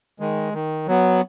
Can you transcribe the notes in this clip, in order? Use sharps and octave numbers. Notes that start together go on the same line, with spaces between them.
D#3 G#3
D#3
F#3 B3